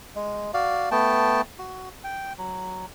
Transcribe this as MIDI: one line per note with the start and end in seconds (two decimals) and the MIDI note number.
0.16 0.51 56
0.54 0.89 66
0.54 0.89 74
0.54 0.89 77
0.91 1.41 57
0.91 1.41 59
0.91 1.41 79
0.91 1.41 81
1.59 1.89 66
2.04 2.33 79
2.38 2.86 54